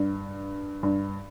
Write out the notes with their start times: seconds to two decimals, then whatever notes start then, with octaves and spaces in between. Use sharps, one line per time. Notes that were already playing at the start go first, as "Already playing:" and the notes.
Already playing: G2
0.83 G2